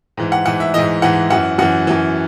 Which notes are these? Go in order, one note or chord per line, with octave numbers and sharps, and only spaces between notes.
G#2 E3
F#5
G#2 E3 F#5
E5
G#2 E3 D#5
G#2 E3 F#5
F#2 E3 F#5
F#2 E3 F#5
F#2 E3